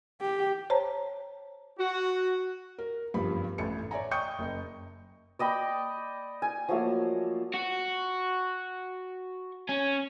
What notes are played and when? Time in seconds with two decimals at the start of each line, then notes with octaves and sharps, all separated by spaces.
0.21 G4
0.70 C5 C#5 A5 A#5
1.79 F#4
2.79 A#4
3.14 F#1 G2 F3 G3 B3 B5
3.58 A1 E3 A4 C#7
3.91 C#5 D5 E5 G#5 A#5
4.11 D#5 G5 C#6 D#6 G6 C#7
4.39 F#1 D#5
5.39 D5 D#5 G5 B5
6.42 G#5
6.69 F3 F#3 A3 A#3
7.54 F#4
9.69 C#4